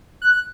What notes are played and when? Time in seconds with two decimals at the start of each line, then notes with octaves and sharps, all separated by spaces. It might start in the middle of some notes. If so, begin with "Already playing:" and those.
0.22 F#6